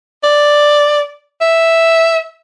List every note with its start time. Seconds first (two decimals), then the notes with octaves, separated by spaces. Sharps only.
0.24 D5
1.41 E5